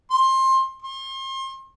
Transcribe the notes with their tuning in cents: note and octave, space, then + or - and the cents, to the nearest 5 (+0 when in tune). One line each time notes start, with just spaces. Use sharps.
C6 +20
C6 +35